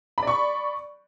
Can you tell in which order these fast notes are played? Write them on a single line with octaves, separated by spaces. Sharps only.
B5 D5 C#6